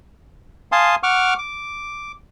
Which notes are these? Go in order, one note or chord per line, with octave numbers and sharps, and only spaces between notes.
F5 G#5 A5 C6 D#6
F#5 C#6 D6 F6
D6